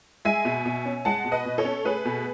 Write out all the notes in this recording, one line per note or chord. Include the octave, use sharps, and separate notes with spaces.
G#3 E5 G#5
B2
B2
C#4
G#3 F#5 A5
B2
B4 D#5
B2
A4 C#5
C#4
A3 G#4 B4
B2